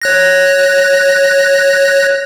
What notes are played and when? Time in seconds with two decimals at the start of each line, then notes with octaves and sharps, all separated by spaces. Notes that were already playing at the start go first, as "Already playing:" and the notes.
0.02 C#5 F#6 A#6